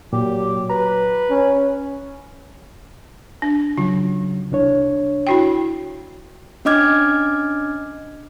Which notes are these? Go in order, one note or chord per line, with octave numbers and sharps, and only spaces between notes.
A#2 F#3 G4
B4 A#5
C#4
D4
C#3 F#3 F4
C2 D4 C#5
E4 F#4 G5
C#4 D4 D#5 D6 F6 G#6